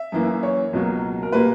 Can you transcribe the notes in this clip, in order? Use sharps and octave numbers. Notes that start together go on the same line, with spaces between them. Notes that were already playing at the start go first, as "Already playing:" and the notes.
Already playing: E5
F#2 E3 A#3
C#5
C#2 B2 F#3 A#3
A#4
A#2 G3 A#3 B4